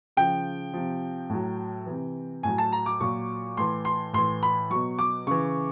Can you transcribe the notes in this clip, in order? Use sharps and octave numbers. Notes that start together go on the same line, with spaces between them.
C#3 F3 G5
C3 F3
A2 F#3
C3 E3
A2 F#3 G#5
A5
A#5
D6
A#2 F#3 C#6
A2 E3 C6
C6
A2 E3 C6
B5
B2 F#3 C#6
D6
C#3 E3 C#6